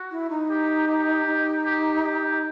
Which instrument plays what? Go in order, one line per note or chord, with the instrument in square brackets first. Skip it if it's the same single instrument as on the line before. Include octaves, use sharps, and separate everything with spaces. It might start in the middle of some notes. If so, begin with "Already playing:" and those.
Already playing: [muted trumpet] F#4
[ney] E4
D#4
[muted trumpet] G4
G4
[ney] D#4
[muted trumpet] G4
G4